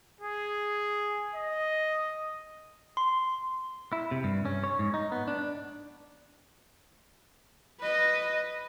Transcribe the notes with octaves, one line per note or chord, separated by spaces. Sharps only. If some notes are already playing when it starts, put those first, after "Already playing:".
G#4
D#5
C6
E4
C3
G2
C#4
C#5
G#2
D#4
B3
D4
B4 D#5